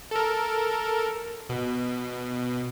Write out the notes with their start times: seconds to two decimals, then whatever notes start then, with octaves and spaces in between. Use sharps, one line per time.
0.11 A4 A#4
1.49 B2